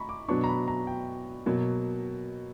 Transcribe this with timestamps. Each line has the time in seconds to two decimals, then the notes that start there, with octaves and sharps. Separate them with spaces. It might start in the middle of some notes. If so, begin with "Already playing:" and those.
Already playing: A#5 B5 C#6
0.09 D6
0.28 B2 F#3 B3 D4 C#6
0.44 A#5
0.48 B5
0.68 A#5
0.87 G5
1.46 B2 F#3 A#3